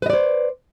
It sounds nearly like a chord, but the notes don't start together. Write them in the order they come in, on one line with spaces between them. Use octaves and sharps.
B4 D#5 D5 C5